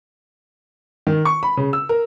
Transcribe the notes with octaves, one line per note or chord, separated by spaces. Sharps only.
D#3
C#6
B5
C#3
E6
A#4